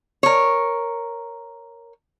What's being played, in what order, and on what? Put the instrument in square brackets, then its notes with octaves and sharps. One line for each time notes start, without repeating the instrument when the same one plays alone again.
[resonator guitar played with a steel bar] A#4 C#5